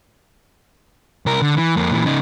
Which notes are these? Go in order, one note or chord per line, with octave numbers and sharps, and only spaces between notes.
C2 A#4
D3
E3
F2 A#3
A#2 E3
C#3 D#4